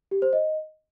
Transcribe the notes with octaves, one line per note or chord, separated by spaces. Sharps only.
G4
C5
D#5